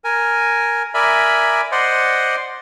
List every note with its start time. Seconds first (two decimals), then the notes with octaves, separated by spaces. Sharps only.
0.04 A#4 G#5
0.94 A#4 D5 E5 G#5 B5
1.72 C5 D5 D#5 F#5 C6